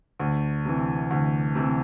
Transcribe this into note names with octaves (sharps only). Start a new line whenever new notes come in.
D2
C3 E3
D2
C3 E3